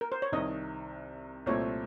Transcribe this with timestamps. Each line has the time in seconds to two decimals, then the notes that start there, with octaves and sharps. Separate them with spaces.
0.01 A#4
0.12 C5
0.22 C#5
0.32 C2 C3 D#3 D#5
1.46 C2 A#2 A3 C4 C#5